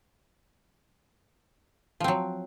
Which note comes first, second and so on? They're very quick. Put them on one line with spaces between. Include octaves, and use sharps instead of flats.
F3 C4 F#3